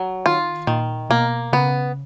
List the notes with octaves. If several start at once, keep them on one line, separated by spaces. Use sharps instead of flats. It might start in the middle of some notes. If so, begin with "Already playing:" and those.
Already playing: F#3
D#3 F4
A#2 D#3
B2 A#3
C#3 B3